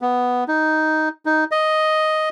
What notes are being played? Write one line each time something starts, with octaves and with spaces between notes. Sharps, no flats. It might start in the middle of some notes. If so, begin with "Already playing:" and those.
B3
D#4
D#4
D#5